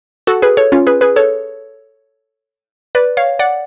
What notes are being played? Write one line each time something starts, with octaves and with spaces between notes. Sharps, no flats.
F#4 A4
G#4 B4
A4 C#5
C#4 F4
G#4 B4
G#4 B4
A4 C#5
B4 D5
C#5 F5
D5 F#5